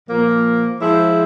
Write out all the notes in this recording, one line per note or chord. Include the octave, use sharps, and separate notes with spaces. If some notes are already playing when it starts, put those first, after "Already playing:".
A#2 F3 A#3
F3 G#3 E4 G#4 C5